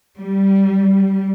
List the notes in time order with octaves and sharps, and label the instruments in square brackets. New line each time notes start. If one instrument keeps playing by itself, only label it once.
[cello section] G3